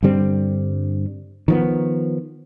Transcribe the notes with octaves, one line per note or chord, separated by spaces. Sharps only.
G2 D3 G3 C4
D#3 F3 B3